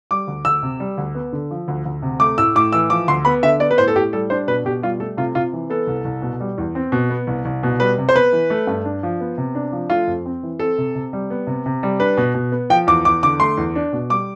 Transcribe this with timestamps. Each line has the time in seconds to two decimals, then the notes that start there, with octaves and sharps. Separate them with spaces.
0.11 G3 D6
0.28 D2
0.45 D2 E6
0.63 C3
0.80 G3
0.98 D2
1.15 B3
1.32 D3
1.51 F3
1.68 D2
1.85 D2
2.02 C3
2.20 A3 D6
2.38 A2 E6
2.55 A2 D6
2.72 E3 E6
2.90 F3 D6
3.08 D2 C6
3.25 B3 B5
3.43 D3 E5
3.60 B3 D5
3.71 B4
3.78 A2 C5
3.88 A4
3.95 A2 G4
4.13 G3 A4
4.30 D4 C5
4.47 B2 B4
4.65 B2 G4
4.82 G3 F4
5.00 A3 A4
5.17 C3 F4
5.35 C3 F4
5.53 E3
5.70 B3 A4
5.87 C2
6.05 C2
6.22 B2
6.40 G3
6.58 E2
6.75 C4
6.92 B2
7.10 B3
7.27 C2
7.45 C2
7.63 B2
7.80 G3 B4
7.98 C3
8.09 C5
8.16 B3 B4
8.32 E3
8.50 A3
8.67 G2
8.85 D4
9.03 F3
9.21 B3
9.38 C3
9.55 D4
9.72 F3
9.90 A3 F4
10.07 F2
10.26 C4
10.43 E3
10.59 C4 A4
10.78 C3
10.95 C3
11.13 G3
11.30 B3
11.47 C3
11.66 C3
11.83 G3
12.00 D4 B4
12.17 B2
12.34 B2
12.52 B3
12.70 F3 G5
12.87 E2 D6
13.05 E2 D6
13.23 D3 D6
13.40 A3 C6
13.57 E2
13.75 D4
13.93 B2
14.10 G3 D6